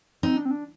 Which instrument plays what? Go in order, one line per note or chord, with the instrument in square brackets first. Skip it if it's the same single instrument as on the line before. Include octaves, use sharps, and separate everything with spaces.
[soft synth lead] C4 [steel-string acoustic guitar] D#4
[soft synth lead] D4
C4
D4